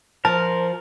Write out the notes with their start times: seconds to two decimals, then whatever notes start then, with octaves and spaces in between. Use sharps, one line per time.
0.25 F3 A#4 C5 A5